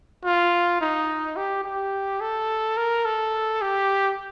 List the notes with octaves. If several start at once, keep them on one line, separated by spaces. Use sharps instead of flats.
F4
D#4
G4
G4
A4
A#4
A4
G4